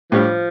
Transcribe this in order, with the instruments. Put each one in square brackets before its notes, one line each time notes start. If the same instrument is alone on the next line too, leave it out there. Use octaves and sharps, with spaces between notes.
[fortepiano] A2 G3 D4 G4 [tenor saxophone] F3